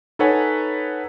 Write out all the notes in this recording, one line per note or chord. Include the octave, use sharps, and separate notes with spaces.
D#4 A4 B4 C#5 F#5 G#5